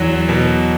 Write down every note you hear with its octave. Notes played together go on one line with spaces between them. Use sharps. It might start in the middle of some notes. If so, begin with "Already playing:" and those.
Already playing: E2 F#3
B2